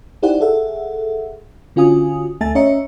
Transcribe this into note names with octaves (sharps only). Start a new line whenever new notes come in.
D#4 E4 G4 C5 D5 F#5
G#4 A4 E5 F#5
D3 C#4 F4 F#4 G#5 D#6
D2 A3 E5 G#5 A5 A6
C#4 C#5 D#5 E5 A#5 C#7